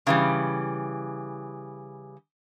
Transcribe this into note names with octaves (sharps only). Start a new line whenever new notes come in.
C#3 E3 G3